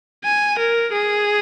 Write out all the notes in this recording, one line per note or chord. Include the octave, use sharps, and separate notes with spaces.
G#5
A#4
G#4